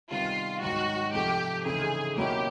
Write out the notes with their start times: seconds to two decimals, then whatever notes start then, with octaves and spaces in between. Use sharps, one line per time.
0.10 C3 D#3 G3 B3 F4
0.62 G#2 D#3 F#3 F#4
1.13 C3 F3 A3 C4 G4
1.65 C#3 E3 A3 C4 D#4 G#4
2.17 B2 F#3 A#3 C#4 E4 G4